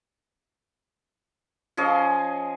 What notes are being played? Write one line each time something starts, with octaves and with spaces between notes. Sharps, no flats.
F3 C#4 G#4 D#5